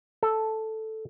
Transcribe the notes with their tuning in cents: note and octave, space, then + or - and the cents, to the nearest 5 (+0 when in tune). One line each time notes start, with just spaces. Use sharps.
A4 +0